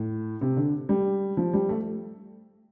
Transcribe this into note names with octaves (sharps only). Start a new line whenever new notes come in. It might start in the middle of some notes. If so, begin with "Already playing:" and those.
Already playing: A2
C3
D3
G3
F3
G3
A3